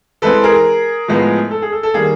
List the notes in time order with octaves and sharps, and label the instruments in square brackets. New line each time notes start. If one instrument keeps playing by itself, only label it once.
[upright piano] E3 G#3 C4 A4 B4
G#4 A#4
A2 F3 G#3 B3
A4
G#4
A4
A4
D#3 G3 A#3 G#4